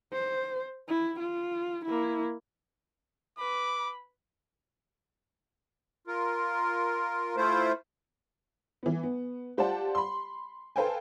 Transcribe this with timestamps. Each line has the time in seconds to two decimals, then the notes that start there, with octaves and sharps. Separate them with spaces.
0.13 C5
0.89 E4
1.20 F4
1.86 A#3 E4
3.38 B4 B5 D6
6.07 F4 A#4
7.37 A3 E4 F4 C5
8.83 E3 B3
9.03 B3
9.57 F4 G4 C5 D5 F#5 A5
9.95 B5 C6
10.76 A4 B4 C5 F5 G5 G#5